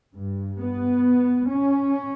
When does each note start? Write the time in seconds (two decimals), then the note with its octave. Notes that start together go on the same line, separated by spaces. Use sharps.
0.14 G2
0.60 B3
1.51 C#4